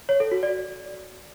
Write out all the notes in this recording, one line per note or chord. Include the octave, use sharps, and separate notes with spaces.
C#5
A4
F#4
D5